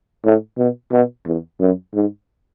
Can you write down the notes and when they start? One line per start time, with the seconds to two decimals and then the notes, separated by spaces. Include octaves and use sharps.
0.24 A2
0.58 B2
0.92 B2
1.26 E2
1.60 F#2
1.95 G#2